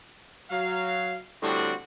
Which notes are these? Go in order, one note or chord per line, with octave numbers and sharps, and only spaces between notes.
F#3 F5
A2 D3 G3 C4 D4 F#4